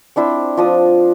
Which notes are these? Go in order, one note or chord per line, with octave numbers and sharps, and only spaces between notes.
C4 D4 E4 C5
F3 D4 D#6